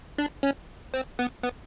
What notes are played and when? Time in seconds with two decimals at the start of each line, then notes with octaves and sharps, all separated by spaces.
0.18 D4
0.43 C#4
0.94 C4
1.19 B3
1.43 B3